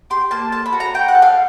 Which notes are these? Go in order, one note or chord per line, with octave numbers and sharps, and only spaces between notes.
G4 C6
A#3 A5
A4 A5
B5
F#4
A#5
F#4 G5
F#5
A4
F5